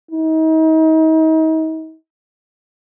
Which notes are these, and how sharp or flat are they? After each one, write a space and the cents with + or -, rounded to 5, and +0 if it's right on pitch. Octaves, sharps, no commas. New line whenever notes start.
D#4 +35